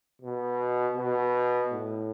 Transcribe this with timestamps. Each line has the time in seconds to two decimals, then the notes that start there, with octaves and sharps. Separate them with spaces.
0.22 B2
0.97 B2
1.72 A2